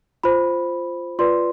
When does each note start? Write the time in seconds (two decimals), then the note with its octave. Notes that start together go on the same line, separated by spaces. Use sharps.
0.24 F4 C5 B5
1.19 F4 B4 D5 C6